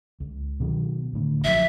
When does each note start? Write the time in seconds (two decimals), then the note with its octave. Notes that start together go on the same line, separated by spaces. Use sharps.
0.20 C#2
0.60 B2 D#3 F#3
1.13 D1 D2
1.44 A#1 F3 F#3 E5